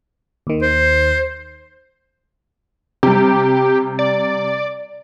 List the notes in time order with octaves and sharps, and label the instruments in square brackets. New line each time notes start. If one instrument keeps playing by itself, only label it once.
[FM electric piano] D#2 D#3
[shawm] C5
[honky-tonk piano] C3 G3 [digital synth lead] G4
[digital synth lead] D5